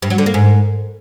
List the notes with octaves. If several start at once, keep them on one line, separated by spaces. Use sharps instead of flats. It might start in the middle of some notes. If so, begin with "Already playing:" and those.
G2
F#3
D3
A#3
G#2